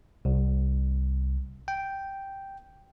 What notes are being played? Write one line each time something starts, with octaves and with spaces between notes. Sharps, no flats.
C2
G5